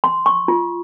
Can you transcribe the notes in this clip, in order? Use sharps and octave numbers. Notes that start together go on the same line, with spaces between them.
C6
C#6
F4